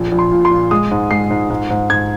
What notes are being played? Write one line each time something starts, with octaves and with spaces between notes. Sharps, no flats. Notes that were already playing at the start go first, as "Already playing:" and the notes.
Already playing: A#1
A#1
C6
A#2
C6
A#2
G#3 D#6
G#2
G#3 C7
G#2
G#2
G#2
G#2 G#6